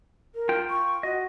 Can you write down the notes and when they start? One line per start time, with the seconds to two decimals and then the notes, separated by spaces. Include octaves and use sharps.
0.35 A#4
0.49 F4 G5
0.69 C#6
1.03 F#4 D#5